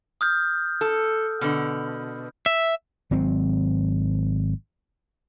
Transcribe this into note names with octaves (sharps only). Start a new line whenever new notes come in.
D#6 F6 G6
A4
B2 D3
E5
G#1 F#3 C4